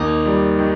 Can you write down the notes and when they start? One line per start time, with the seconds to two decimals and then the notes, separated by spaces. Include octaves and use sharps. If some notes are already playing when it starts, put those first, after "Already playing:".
Already playing: D#2 A#3 D#4
0.26 G3
0.59 D#3